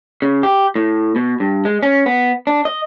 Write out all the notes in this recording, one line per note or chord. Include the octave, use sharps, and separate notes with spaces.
C#3
G4
A2
B2
G2
G#3
C#4
B3
D4
D#5